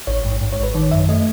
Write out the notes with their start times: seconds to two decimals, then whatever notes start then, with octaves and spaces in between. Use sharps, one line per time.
0.07 A1 C#5
0.25 G#2
0.41 G#2
0.52 C#5
0.59 A1 B4
0.75 D#3 C#5
0.91 F#2 E5
1.09 A3 D#5